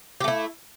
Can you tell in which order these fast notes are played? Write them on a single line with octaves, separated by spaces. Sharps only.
G4 A3 E4